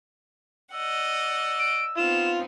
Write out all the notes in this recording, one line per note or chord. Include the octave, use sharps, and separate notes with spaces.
D5 D#5 F#5 E6
D7
B3 C4 D#4 F4 E7